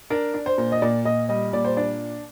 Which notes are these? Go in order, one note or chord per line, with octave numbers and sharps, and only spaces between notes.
D4 A#4
D4
C5
A#2
D#5
A#2 D5
A#2 D#5
G3 D#5
A#2 D5
C5
D4 D5